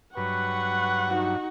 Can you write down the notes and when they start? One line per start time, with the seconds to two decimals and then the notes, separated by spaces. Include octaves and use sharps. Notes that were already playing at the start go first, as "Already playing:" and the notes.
0.17 G2 F#3 B4 F#5 C#6
1.08 D#4 F#4